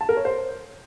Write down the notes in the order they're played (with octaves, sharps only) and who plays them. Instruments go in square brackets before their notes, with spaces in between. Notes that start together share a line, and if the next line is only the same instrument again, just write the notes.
[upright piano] A5
A#4
C#5
C5